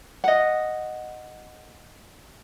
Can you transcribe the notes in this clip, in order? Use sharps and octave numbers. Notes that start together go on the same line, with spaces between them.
D#5 F#5